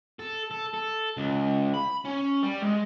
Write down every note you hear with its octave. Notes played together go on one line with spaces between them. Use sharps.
A4
A4
A4
C#2
B5
C#4
G3
G#3